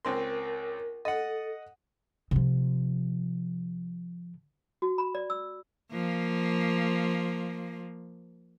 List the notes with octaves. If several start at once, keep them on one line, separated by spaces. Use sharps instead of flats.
C#2 C4 A#4 C6
A4 D#5 F#5
C3 F3
F#4
B5
D5
E6
F3 A#3